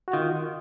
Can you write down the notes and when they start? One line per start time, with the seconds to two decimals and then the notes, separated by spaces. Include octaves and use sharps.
0.08 F#4
0.13 D#3 F4